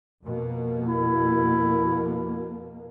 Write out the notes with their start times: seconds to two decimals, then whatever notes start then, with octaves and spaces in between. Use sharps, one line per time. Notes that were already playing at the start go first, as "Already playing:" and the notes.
0.24 F2 B2 A#3
0.86 E4